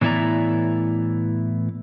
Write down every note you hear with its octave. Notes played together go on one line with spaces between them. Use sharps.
A2 E3 B3 E4 D5 A#5